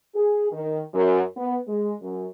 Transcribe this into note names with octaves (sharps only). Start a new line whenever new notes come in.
G#4
D#3
F#2
B3
G#3
F#2